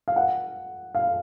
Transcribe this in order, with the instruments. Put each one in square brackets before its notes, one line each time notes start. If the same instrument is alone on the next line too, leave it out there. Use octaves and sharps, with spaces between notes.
[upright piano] F5
F#5
F5